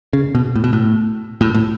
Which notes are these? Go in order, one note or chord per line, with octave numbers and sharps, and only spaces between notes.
C#3
B2
A2
B2
A2
A2
A2